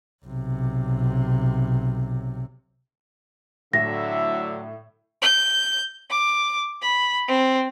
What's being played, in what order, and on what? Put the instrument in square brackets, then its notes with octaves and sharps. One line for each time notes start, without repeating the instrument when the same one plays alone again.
[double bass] B1 C3
[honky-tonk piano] A2 [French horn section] D3 F#3 [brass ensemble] E4 E5 [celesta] A#6
[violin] G6
D6
B5
C4